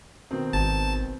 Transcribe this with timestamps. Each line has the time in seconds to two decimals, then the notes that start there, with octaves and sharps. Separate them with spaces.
0.31 B2 D#3 C4
0.53 G#1 A5